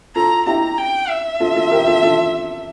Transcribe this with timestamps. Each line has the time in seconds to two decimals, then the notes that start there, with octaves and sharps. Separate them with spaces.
0.16 F4 A4 A#5
0.46 E4 G4 A#5
0.78 G5
1.09 E5
1.40 F4 A4
1.56 F4 A4
1.71 G4 A#4
1.87 F4 A4
2.02 F4 A4